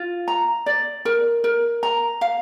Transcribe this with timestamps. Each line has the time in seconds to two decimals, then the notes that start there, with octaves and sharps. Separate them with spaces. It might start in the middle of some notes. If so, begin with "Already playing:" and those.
Already playing: F4
0.28 A#5
0.66 D5
1.05 A#4
1.44 A#4
1.83 A#5
2.21 F5